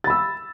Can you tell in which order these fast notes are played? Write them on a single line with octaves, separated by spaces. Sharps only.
A6 B5 E6